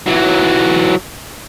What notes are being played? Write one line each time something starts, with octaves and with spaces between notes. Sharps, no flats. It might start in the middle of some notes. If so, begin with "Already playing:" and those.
E3 F#3